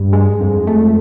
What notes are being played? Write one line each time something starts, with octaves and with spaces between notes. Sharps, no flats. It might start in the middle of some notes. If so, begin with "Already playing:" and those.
Already playing: G2
G#3
F2
A3